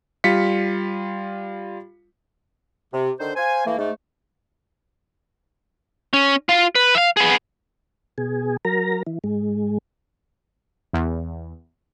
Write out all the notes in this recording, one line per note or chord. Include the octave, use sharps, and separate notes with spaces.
G3 F4 B6 C#7
C3
D3 D#3 C5
C5 F5 G#5
E3 A3 A#3
G#2 A3
C#4
F4 F5
B4
E5 F5
B3 G#4
B2 G#4
F#3 A#4 A#5
E3
G#2 G#3
E2